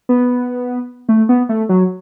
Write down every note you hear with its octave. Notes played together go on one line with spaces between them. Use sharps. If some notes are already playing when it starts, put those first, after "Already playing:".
B3
A3
B3
A3
F#3